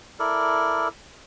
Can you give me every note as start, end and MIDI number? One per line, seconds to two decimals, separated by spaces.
0.19 0.88 64
0.19 0.88 69
0.19 0.88 70
0.19 0.88 74